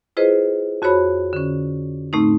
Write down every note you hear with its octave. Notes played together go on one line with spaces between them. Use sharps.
E4 F4 G#4 B4 C5 D#5
F2 F#4 C5 C#5 B5
D3 C#4
A2 A3 C4 D#4